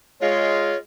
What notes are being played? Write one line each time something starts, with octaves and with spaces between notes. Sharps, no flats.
G#3 F4 C#5